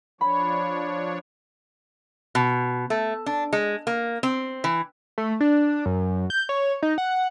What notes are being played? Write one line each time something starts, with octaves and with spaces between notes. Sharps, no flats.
F3 D4 C#5 B5
B2
A3
D4
G#3
A#3
C4
E3
A3
D4
F#2
G6
C#5
D#4
F#5